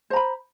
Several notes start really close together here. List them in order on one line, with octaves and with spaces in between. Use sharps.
C5 A#5 B5